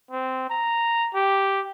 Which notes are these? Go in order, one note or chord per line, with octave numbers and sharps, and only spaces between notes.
C4
A#5
G4